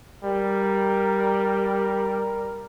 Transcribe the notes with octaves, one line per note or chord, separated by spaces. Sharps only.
G3 A#4